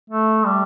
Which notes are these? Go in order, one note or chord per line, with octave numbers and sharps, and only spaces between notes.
A3
G3